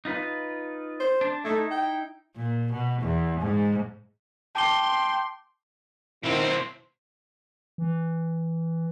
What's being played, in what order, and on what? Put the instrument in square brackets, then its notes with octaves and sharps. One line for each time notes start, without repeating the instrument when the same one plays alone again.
[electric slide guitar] D#4 F4 B4
[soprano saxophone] C5
[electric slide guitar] D4
[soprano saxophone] A3 [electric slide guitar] D#4 E4
[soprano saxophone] G5
[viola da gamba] A#2
B2
E2
G#2
[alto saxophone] G5 [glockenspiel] A5 D6 G7 [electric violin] C6
[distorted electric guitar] B2 C4 [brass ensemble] D#3 E4 F4
[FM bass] E3